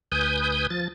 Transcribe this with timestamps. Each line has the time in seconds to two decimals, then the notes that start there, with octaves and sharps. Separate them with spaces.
0.12 D2 B4 G#5 D#6 G6
0.70 F3 A6